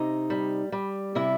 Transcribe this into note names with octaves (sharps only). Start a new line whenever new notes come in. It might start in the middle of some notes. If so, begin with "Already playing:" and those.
Already playing: C3 D#4
G3
G3
C3 E4 E5